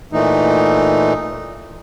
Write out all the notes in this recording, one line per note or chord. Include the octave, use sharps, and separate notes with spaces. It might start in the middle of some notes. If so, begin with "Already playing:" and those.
A#2 E3 A3 D#4